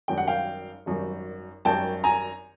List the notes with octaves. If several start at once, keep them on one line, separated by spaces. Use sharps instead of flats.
G#1 F#2 D#3 G3 G5
F#5
F5 G5
G#1 F#2 D#3 G3
G#1 F#2 D#3 G3 G5 A5
G#5 A#5